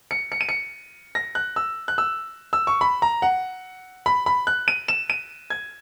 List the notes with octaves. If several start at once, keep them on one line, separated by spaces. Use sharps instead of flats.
C#7
C#7
D#7
C#7
A#6
F#6
E6
F#6
E6
E6
C#6
B5
A#5
F#5
B5
B5
F#6
D#7
E7
D#7
G#6